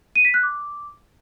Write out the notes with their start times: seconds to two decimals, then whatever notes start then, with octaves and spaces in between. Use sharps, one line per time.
0.16 D#7
0.25 B6
0.34 F#6
0.43 D6